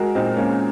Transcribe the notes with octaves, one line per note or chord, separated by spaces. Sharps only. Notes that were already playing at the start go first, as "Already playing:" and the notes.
Already playing: G#3 F#4 A#4
A#2 C4 D#4
G#3 A#3 C#4